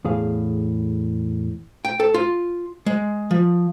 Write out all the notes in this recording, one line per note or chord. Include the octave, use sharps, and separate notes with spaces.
E2 A2 G#4 F5
G5
A4
F4
G#3
F3